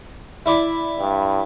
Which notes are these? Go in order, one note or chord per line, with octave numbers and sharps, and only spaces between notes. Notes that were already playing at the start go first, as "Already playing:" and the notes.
E4 D5 D6
G2